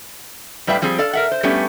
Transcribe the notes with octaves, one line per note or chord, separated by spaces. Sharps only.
A2 G3 B4 E5 F5 G5
F3 G3 C4 G#4
A4 D5 F5
A#4 E5 F#5
C5
G3 A3 B3 C#4 G4